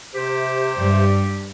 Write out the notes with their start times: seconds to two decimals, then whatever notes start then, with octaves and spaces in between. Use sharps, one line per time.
0.15 C3 G4 C5
0.76 G2